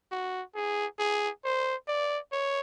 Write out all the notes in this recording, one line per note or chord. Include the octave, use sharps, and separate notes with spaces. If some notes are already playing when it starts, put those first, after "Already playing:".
F#4
G#4
G#4
C5
D5
C#5